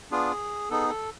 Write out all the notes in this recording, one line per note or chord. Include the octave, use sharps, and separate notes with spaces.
B3 D4 F4 G#4
B3 D#4 G#4 A4
A4